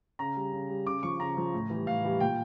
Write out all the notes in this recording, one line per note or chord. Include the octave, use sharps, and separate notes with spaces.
C#3 A#5
G3
C#3
G3
C#3 D6
F3 C#6
C#3 A#5
F3
A2
E3 G3
A2 F5
E3 G3
A#2 G5